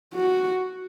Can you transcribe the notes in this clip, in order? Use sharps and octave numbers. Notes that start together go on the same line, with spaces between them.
F#4